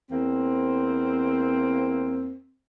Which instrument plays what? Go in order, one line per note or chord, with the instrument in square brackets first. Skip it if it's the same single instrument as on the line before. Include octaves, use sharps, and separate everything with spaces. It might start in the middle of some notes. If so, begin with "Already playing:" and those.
[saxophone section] E2 A#3 C4